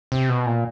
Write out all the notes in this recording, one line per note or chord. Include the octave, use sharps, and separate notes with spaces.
C3
B2
A#2